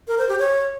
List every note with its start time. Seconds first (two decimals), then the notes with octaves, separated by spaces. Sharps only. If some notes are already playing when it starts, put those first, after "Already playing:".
0.08 A#4
0.18 C5
0.29 G4
0.39 C#5